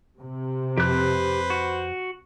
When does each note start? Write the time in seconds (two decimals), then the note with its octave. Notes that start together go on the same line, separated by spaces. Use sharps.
0.18 C3
0.78 F2 G4 B4 C5 F#6
1.50 F#4